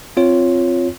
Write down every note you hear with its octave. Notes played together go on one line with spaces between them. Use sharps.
C4 F4 C#5